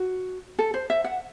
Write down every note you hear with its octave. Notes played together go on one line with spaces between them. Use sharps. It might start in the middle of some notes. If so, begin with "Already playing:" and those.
Already playing: F#4
A4
C5
E5
F#5